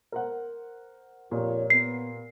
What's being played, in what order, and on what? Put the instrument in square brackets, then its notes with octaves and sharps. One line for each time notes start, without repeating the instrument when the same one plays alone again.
[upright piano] A#4 C5 F#5
[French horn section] F2 F4 C#5 [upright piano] A#2 G4 A#4
[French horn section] B3 [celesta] C7